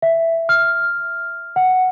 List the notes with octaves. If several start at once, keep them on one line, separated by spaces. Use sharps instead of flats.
E5
F6
F#5